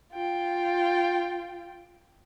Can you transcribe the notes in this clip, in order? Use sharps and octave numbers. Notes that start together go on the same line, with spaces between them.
F4 G5